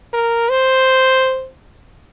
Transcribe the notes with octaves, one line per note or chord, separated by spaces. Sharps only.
A#4
C5